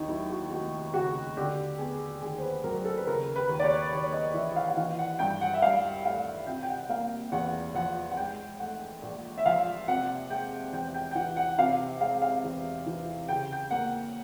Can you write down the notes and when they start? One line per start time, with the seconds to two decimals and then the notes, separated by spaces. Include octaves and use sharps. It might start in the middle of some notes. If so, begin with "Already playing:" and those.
Already playing: D#2 D#4
0.08 F#3 E4
0.30 F#4
0.51 F1 F#4
0.94 C#3 F#4
1.37 D3 G4
1.78 B3 G#4
2.22 D#2 G#4
2.38 C5
2.42 B4
2.64 F#3 A#4
2.85 A4
2.97 B4
3.07 C#3 A#4
3.36 B4
3.49 D#2
3.60 D5
3.64 C#5
3.92 D#2 D5
4.13 D#5
4.34 E3 E5
4.56 F5
4.68 F#5
4.77 E3 F5
4.99 F#5
5.19 G2 G5
5.41 F#5
5.54 E5
5.62 G2 F5
6.05 A3 F5
6.47 C3 G5
6.63 G5
6.69 F#5
6.89 A#3 F5
7.32 E2 F#5
7.75 F3 F#5
8.11 F#5
8.17 G#2 G5
8.60 A3 F#5
9.02 A#1
9.38 E5
9.45 F3 F5
9.88 C3 F#5
10.30 G#3 G5
10.73 E2 G5
10.94 G5
11.11 G5
11.15 E3 F#5
11.37 F#5
11.58 C3 F5
12.00 G#3 F5
12.22 F5
12.44 E2
12.86 E3
13.28 C#3 G5
13.52 G5
13.71 A#3 F#5